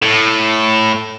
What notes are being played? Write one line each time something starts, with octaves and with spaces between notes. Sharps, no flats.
A2